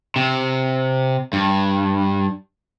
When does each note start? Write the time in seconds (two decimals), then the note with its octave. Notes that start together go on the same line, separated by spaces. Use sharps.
0.16 C3
1.33 G2